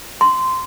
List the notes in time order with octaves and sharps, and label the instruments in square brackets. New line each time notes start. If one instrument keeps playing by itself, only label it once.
[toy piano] C6